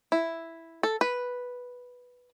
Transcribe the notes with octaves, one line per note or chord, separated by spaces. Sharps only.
E4
A4
B4